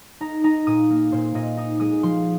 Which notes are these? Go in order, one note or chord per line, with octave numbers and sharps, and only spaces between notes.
D#4 A#5
D#4 A#5
A#2 D#6
A#3
A#2 C5
A#2 D#5
D#4 D#6
G#3 D#6
F3 C6